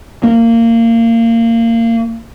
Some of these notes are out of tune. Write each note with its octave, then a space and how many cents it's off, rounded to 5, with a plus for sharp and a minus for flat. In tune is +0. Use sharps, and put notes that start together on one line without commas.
A#3 -25